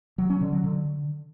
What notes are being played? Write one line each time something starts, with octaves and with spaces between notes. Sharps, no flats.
F#3
C#4
D3
F#3
D3